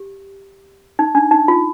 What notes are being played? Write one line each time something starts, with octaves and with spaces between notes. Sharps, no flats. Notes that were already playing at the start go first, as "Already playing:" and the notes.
Already playing: G4
D#4
D4
D#4
F4